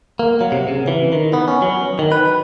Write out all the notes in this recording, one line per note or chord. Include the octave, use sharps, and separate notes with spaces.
A#3
F#3
C3
C#3
E3
D#3
B3
C#4
F#3
D#3
B4